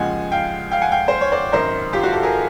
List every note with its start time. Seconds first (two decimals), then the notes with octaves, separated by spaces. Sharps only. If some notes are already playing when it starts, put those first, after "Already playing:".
Already playing: D#2 C#3 F3 G#3 F#5 G#5
0.32 F5 G5
0.71 F5 G5
0.82 F#5 G#5
0.92 F5 G5
1.08 C5
1.21 C#5
1.32 C5 D5
1.52 G#1 F#2 D#3 A#4 C5
1.93 F4 G4
2.03 F#4
2.13 G4 A4
2.23 G#4 A#4